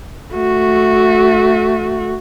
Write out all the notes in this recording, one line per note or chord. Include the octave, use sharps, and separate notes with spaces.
A3 F#4